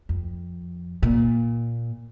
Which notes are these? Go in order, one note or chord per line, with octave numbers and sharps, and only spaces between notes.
F2
A#2